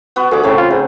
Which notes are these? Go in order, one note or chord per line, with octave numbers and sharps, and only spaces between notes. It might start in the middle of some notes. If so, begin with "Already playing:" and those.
B3 F#4 B4
D2 G#4 D6
A2 C#3 A3 C4
F4
G#2 B4